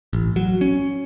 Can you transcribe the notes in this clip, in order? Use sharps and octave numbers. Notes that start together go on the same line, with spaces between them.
A1
F#3
C#4